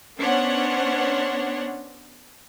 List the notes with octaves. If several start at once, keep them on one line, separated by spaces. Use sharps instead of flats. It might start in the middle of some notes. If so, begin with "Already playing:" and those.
B3 C#4 D4 C5 C#5 F#5